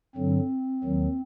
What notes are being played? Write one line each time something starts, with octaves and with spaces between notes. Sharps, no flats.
G2 D3 F#3 C4
D#2 D#3 F#3